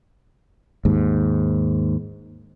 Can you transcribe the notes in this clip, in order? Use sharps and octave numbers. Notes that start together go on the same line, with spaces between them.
D#2 G#2